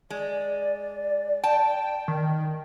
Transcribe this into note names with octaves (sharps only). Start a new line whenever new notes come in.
G#3 D5
G5 A5
D#3